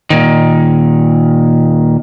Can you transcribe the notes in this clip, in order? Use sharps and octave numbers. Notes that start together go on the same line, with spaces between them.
A#2 D#3